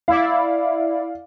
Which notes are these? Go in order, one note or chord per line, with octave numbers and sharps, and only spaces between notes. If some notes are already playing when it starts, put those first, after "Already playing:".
E4 D5 F5